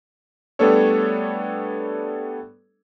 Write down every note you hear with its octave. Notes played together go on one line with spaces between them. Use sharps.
G3 A3 B3 D4 A4 C#5